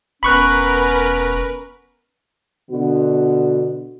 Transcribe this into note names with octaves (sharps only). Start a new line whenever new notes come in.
E1 B3 C#4 A#4 B4 B5 C#6 F#6
B2 D3 B3 F#4